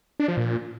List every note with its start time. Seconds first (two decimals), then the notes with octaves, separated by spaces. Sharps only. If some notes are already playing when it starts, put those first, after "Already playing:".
0.20 D4
0.28 F3
0.37 A#2